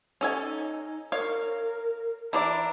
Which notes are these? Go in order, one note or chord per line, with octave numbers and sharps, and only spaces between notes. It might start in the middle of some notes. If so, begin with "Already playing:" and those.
C#4 A4 G#5
D#4
A#4 C#5 F5
E3 D4 D5 A#5